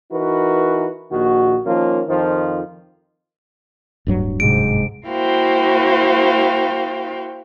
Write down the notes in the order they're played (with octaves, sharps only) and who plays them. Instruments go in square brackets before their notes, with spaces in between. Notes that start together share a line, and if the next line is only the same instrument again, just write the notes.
[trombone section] E3 D#4 F#4 A#4 B4
A#1 A#2 D#3 F#4
D#3 F3 A#3 C#4 F4
F2 D#3 F3
[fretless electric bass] D1 G2 F#3
[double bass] G#2 C3 [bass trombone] G#3 [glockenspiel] D7
[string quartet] A#3 E4 F#4 C5 F5 G5